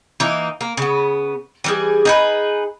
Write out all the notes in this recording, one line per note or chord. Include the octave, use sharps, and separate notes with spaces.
E3 A#3 D#4
A#3
C#3 B3
E3 G3 G#4
D#4 G#4 B4